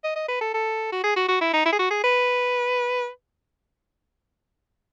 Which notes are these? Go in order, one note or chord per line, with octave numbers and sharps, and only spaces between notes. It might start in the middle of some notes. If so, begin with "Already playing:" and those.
D#5
D#5
B4
A4
A4
F#4
G#4
F#4
F#4
E4
D#4
E4
G#4
F#4
G#4
B4